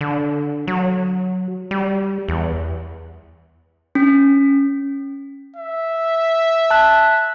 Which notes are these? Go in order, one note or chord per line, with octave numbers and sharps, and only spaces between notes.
D3
F#3
G3
E2
C#4
E5
A5 F#6